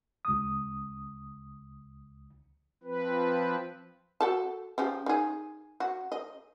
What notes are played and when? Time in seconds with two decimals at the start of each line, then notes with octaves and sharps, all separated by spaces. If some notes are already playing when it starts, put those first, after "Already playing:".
0.25 C#2 D#6
2.83 F3 C4 B4
4.21 F#4 A4 A5
4.78 C#3 F3 G4
5.06 D#4 G#4
5.80 F#4
6.12 D#5